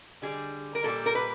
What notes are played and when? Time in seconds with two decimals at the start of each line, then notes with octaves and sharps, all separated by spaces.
0.22 D3 G3 G#4
0.75 A#4
0.84 A#2 G3 A4
1.06 A#4
1.15 B4